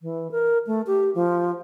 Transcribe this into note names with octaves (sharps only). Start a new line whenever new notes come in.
E3
A#4
A3
G4
F3